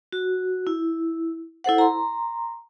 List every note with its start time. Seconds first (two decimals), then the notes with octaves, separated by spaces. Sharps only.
0.13 F#4
0.67 E4
1.64 E4 A4 C5 F#5
1.78 A#5 C6